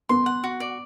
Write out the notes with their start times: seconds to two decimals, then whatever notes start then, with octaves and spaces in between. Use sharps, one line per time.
0.09 B3 C6
0.26 F#5
0.44 F#4
0.60 D5